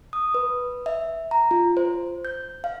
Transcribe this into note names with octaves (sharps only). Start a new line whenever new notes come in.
D#6
B4
E5
A#5
F4
C5
G6
F5